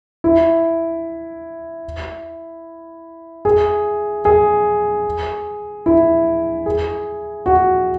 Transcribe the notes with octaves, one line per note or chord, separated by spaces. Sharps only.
E4
G#4
G#4
E4
G#4
F#4